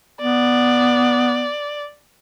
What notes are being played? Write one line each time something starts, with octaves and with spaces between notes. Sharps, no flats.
B3 D5